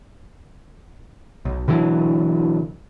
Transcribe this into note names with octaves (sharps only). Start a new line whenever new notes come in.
B1
B2 D3 E3 F#3